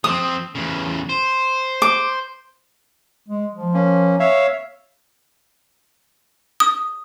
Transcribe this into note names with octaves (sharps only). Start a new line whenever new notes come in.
F3 C4 D#6
E2 C#3
C5
D6
G#3
F3
A#3 C#4
C#5 E5 F5
D#6